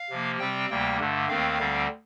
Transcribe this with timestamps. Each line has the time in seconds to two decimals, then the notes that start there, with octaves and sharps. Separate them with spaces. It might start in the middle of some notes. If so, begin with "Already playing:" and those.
Already playing: F5
0.10 C3 F3 A#3
0.39 C3 G3 C4 G5
0.70 D2 C3 G3 A#3 G5
0.98 G2 D3 A3
1.28 D#2 D#3 A3 C4 F5
1.58 D2 D3 G3 C4